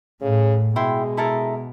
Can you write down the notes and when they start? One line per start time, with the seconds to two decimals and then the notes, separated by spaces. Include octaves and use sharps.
0.21 A2 C#3
0.76 B2 G#3 E4 G5 C6
1.17 E4 A4 A#4